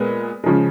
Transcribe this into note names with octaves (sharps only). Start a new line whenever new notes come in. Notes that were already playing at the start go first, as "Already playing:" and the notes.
Already playing: A#2 G#3 B3
C#3 F3 G#3